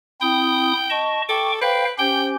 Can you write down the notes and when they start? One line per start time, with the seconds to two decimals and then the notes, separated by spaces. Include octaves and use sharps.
0.21 C4 E4 G5 D#6
0.90 D#5 A5 C#6
1.29 A4 G5 C#6 D6
1.61 B4 C5 F5 G5
1.99 C#4 G4 C5 G5